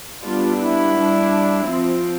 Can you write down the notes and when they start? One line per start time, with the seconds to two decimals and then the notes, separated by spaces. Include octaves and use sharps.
0.24 G3 B3 D4 F4
0.59 E4
0.96 G3 D4
1.68 F3 C4